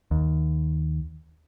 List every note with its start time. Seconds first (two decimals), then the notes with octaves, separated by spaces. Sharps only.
0.11 D#2